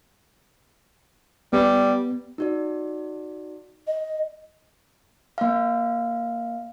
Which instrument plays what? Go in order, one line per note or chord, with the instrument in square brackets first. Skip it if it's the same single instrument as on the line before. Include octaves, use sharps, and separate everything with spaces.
[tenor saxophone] G3 [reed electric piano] B3
[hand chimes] D#4 F#4 D5
[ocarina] D#5
[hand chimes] A#3 F5